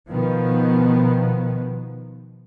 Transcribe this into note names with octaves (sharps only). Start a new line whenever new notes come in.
B2 D#3 F3 B3